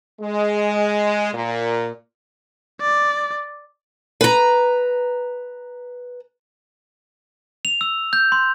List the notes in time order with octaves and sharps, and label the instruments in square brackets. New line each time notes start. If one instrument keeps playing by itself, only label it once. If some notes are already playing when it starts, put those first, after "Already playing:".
[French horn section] G#3
A#2
[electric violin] D5
[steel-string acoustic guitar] B4 A#5
[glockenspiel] F7
E6
G6
C6